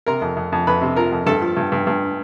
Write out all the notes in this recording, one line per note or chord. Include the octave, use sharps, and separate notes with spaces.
C3 A#4 A#5
F2
F2
F2
F2 B4 B5
C3
F3 A#4 A#5
F2
G2 A4 A5
F3
G2
G2
G2